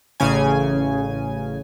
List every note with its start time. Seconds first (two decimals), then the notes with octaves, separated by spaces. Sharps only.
0.20 A1 C#3 G#5